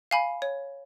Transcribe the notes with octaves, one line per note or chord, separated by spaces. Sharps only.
F5 G#5 B5
C#5